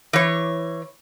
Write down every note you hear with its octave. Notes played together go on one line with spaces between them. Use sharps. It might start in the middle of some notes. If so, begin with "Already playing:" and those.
E3 C#5